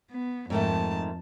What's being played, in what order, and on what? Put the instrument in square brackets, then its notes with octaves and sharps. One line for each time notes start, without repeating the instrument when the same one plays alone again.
[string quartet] B3
[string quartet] F2 A5 [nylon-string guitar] G#2 D#3 A3